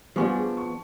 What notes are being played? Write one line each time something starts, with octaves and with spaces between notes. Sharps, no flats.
F3 G3 B3 D4 G#5 C#6
G#4
C#6